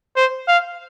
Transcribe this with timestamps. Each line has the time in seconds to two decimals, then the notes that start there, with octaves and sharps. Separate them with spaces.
0.16 C5
0.48 F5